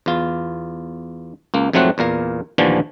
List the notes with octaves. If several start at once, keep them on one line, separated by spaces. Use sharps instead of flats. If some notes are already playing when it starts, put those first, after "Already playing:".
E2 F4
C#2 A#3
F2 G#2 F#3 A3 C4 F#5
E2 A#2 A#4 F5
D#2 A#2 D3 E3 F3 A3